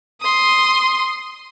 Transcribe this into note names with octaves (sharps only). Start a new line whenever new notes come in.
C6 D#6